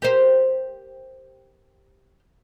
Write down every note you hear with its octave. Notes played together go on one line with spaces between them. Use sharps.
G4 A#4 C5